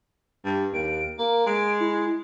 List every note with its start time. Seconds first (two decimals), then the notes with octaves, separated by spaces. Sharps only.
0.45 G2
0.73 D#2 D7
1.19 A#3 A#4
1.46 G#3 D7
1.80 E4